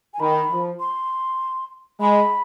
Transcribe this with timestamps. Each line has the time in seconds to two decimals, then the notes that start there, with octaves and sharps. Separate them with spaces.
0.14 G#5
0.20 D#3 B5
0.49 F3
0.80 C6
2.00 G#3 B5